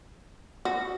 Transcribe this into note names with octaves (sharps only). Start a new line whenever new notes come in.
F#4